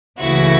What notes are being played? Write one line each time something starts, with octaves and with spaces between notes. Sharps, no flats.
C#2 C#3 E3 A3 E4 F#4